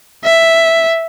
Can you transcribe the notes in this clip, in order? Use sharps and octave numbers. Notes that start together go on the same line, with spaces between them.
E5